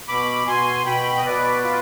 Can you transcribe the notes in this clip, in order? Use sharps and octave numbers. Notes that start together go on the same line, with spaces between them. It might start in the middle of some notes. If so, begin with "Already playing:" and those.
B2 B5 D6
B2 G#5 C6
B2 G5 B5
D#5
B2 B4 D5
F4